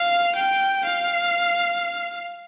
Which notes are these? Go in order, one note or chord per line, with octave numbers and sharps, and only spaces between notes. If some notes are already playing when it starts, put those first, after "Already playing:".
Already playing: F5
G5
F5